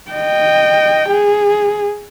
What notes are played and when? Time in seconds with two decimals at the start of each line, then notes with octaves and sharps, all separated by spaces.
0.11 D#5 G5
1.10 G#4